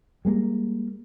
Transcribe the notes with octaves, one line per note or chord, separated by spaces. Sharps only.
G3 G#3 A#3